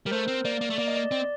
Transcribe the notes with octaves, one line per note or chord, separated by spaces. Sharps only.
G3 A#4
A3 C5
C4
A#3 D5
A#3
A3
A#3 D5
D#5
D5
C4 D5